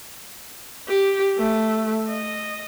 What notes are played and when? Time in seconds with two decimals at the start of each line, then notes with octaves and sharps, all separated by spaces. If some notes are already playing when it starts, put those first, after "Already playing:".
0.88 G4
1.38 A3
2.09 D#5